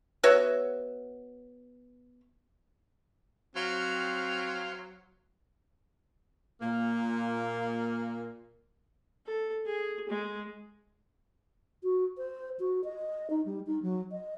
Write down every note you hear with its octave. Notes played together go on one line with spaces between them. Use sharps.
B3 F#4 C#5 E5
F#3 C4 C5 F5
A#2 A#3
A4
G#4
G#3
F#4
C5
F#4
D#5
D#4
G3
D#4
F#3
D#5